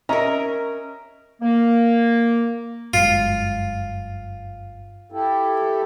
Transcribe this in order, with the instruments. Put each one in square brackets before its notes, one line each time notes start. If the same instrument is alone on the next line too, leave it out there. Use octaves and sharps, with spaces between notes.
[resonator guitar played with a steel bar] C#4 A#4 [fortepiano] D#5 E5 A#5
[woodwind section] A#3
[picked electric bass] G1 F#2 G#3 [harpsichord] F4
[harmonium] E4 G4 A4